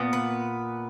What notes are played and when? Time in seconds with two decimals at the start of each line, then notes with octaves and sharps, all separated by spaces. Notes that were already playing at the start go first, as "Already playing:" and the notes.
Already playing: A#2 B3
0.13 B4